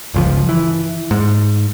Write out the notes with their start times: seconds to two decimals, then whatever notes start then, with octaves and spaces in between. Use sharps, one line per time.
0.14 G1 C#2 F3
0.49 E3
1.11 G#2